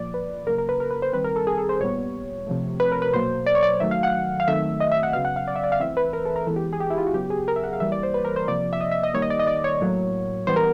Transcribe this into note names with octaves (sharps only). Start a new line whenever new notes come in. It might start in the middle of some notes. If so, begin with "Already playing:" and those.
Already playing: A#2 F3 A#3 D5
B4
C#3 F#3 A#3 A#4
A#4
B4
A#4
B4
C5
D#3 G3 C4 B4
A#4
A4
G#4
A4
C5
A#2 G3 B3 C#5
C3 F3 A3
B4
A#4
B4
B2 F#3 A#3 C5
D5
C#5
D5
D#3 F#3 A3 E5
F5
F#5
F5
D#3 F#3 A3 C4 E5
D#5
E5
F#5
C#3 F#3 B3 F5
F#5
F5
D5
E5
D5
F5
E3 A3 C4 E5
B4
A#4
A4
A#4
E3 G#3 B3 A4
G4
G#4
G4
E4
F4
F#4
C#3 F#3 B3 G4
G#4
A#4
E5
F#5
F5
E3 G3 A#3 E5
D5
C5
B4
A#4
C5
C3 F3 A#3 D5
E5
D#5
E5
D#5
D#3 G3 A#3 C#5
D#5
D5
D#5
D5
C#5
A2 F#3 A#3
E3 G3 B3 C5
A#4